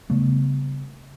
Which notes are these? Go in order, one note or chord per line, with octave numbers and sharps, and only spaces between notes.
C#3 G3 A3 B3